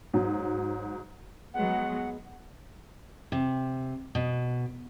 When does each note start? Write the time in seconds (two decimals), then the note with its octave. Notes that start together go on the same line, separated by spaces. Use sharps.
0.14 G#2 F#3
1.54 F#3 G#3 B3 F#5
3.32 C3
4.15 B2